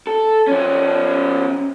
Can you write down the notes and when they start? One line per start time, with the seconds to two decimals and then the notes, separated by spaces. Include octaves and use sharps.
0.07 A4
0.48 F3 C#4